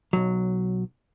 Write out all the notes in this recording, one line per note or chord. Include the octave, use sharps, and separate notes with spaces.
B1 F#3